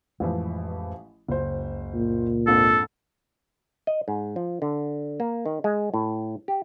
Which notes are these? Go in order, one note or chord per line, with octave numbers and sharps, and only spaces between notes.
A1 F2 E3 F3 G#3
F#1 C#2 C5
A#2
F2 G#2 D4 A4
D#5
G#2
F3
D3
A#3
D#3
G#3
A2
G4